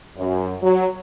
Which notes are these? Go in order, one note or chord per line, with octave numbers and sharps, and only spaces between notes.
F#2
F#3